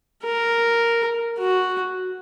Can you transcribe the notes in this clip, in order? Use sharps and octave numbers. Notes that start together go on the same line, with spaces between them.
A#4
F#4